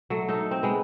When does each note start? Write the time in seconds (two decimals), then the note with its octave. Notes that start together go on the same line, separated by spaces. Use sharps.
0.10 F#3 A3
0.28 D#4 A4
0.51 C4
0.63 G#3 B3